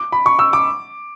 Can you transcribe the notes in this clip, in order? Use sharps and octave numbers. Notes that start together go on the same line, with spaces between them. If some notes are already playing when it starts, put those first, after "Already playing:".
Already playing: D6
B5
C#6
E6
D6